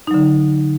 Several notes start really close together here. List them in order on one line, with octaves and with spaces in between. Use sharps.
D#4 F#3 D3